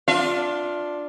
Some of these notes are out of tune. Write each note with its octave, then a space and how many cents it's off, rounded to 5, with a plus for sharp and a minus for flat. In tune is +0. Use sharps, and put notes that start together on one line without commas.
D4 +0 F4 +15 E5 +45